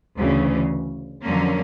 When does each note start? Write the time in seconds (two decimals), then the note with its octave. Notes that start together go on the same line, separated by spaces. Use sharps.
0.19 D2 C#3 E3
1.24 F2 D3 F#3 A#3 C#4